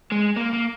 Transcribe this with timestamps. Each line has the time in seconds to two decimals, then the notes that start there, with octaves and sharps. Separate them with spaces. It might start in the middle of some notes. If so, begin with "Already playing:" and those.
0.12 G#3
0.37 A#3
0.53 A#3